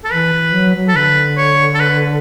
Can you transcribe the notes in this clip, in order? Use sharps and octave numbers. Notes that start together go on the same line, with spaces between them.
A4
E3 B4
E3
F#3
F#3
A4
D3 B4
C#5
A4
B4